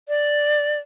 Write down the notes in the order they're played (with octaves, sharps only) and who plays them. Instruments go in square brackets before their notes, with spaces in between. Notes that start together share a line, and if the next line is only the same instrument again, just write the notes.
[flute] D5